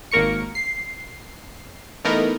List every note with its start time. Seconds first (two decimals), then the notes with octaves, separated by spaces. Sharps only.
0.11 G#1 A#3 A#4 C#6 C#7
0.55 C7
2.05 E3 A3 B3 D#4 A#4